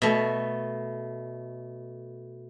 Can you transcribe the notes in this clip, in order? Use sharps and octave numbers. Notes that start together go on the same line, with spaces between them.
B2 A3